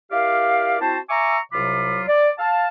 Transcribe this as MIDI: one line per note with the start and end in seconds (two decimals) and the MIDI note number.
0.12 0.78 64
0.12 0.78 67
0.12 0.78 70
0.12 0.78 74
0.12 0.78 77
0.80 0.98 60
0.80 0.98 64
0.80 0.98 66
0.80 0.98 72
0.80 0.98 81
1.10 1.38 76
1.10 1.38 80
1.10 1.38 82
1.10 1.38 85
1.10 1.38 86
1.10 1.38 88
1.52 2.02 36
1.52 2.02 48
1.52 2.02 54
1.52 2.02 65
1.52 2.02 83
1.52 2.02 86
2.07 2.30 74
2.38 2.68 77
2.38 2.68 81